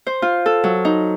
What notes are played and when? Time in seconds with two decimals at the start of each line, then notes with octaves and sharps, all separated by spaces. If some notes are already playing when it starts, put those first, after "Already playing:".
0.07 C5
0.22 F4
0.46 A4
0.64 F#3
0.85 D#4